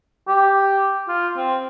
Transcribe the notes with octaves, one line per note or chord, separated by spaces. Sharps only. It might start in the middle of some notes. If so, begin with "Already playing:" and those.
G4
F4
C4